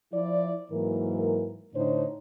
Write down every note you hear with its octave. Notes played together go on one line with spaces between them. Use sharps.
F3 E4 D5
G#2 E3 F#3 A#3 A#4
A2 D3 D4 D#4 C5 C#5